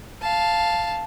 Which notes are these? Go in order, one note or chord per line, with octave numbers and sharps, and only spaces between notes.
F5 A5